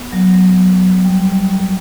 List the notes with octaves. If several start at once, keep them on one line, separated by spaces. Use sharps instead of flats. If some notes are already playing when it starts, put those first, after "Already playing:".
Already playing: B3
F#3
G3